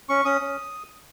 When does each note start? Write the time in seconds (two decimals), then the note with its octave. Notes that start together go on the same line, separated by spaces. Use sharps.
0.09 C#4 C#6
0.25 C#4 D#6
0.41 C#4